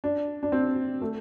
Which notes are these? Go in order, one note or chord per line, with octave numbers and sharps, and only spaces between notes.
D4
D4
C4
A3